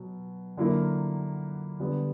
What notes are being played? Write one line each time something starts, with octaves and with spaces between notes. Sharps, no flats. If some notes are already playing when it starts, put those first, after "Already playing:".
Already playing: B2 F#3
D3 F#3 A#3 E4 A#4
D3 G3 B3